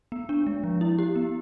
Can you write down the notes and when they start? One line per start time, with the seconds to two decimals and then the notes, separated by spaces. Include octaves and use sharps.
0.12 B3
0.29 D4
0.47 G#3
0.64 F3
0.81 E4
0.99 G4
1.16 B3